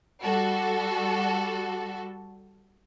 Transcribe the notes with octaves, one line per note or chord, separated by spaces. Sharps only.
G3 F#4 A4